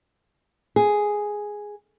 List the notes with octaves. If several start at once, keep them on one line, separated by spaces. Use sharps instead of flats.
G#4